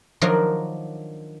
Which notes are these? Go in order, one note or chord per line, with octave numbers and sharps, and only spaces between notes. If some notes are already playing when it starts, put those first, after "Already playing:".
D#3 F3 F#3 D4 F#4 A#4